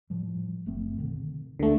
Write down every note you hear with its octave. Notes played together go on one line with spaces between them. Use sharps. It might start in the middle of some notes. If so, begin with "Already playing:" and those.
A2 F3 G3
F#1 A3 C4
B2 D3 D#3
D2 D3 A3